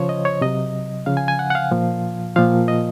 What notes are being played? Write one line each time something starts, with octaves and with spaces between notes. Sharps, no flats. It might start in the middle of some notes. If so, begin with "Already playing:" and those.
Already playing: C#3 F3 C5 C#5
D#5
C#5
C3 F#3 D#5
C#3 F3 F5
G#5
G#5
F#5
F#5
F5
A#2 F3
A#2 F3 F5
D#5